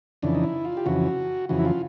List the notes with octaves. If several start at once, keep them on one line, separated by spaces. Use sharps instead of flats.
F2 C#3 E3 D4
D#4
E4
F4
G4
F2 C#3 E3 F#4
F2 C#3 E3 F#4
E4
F4